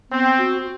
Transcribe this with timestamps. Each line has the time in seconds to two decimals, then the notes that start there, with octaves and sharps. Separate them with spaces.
0.10 B3 C4
0.38 F#4